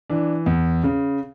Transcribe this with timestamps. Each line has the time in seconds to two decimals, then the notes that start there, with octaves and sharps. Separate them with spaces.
0.10 E3 D4
0.46 E2
0.83 C#3